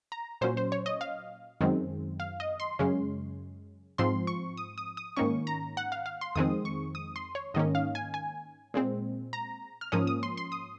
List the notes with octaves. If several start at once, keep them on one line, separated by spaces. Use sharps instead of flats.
A#5
A#2 F#3 C#4 C5
C5
C#5
D#5
F5
F#2 D#3 G#3 C4
F5
D#5
C6
F#2 C#3 G#3 C#4
G#2 F3 C4 C6
C#6
D#6
D#6
D#6
G#2 D#3 A#3 C#4 C#6
A#5
F#5
F5
F5
C6
F2 D#3 G#3 C4 D#6
C#6
D#6
C6
C#5
G#2 D#3 A#3 C#4 D#5
F5
G#5
G#5
A#2 G#3 C4
A#5
F6
G#2 F3 A#3 C#4 D#6
D#6
C6
C6
D#6